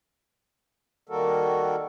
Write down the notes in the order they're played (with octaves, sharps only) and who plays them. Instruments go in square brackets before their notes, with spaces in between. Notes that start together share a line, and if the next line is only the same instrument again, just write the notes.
[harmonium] D#3 G3 A#3 F#4 A4 A#4